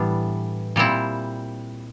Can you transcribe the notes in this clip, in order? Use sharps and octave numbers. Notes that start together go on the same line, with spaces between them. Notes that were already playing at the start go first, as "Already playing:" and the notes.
Already playing: A2 E3 G3 B3 D4
A#2 G3 C4 E4